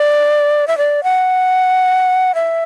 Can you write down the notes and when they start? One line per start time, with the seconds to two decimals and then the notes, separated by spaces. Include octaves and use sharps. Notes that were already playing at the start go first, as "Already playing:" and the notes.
Already playing: D5
0.68 E5
0.78 D5
1.04 F#5
2.35 E5